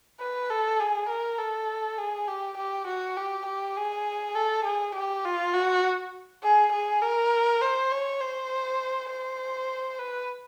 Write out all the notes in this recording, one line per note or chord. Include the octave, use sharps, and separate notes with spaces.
B4
A4
G#4
A#4
A4
G#4
G4
G4
F#4
G4
G4
G#4
A4
G#4
G4
F4
F#4
G#4
G#4
A#4
C5
C#5
C5
C5
B4